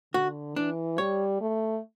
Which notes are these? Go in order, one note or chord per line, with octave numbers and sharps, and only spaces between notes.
D3 F#4
E3 D4
G3 C#5
A3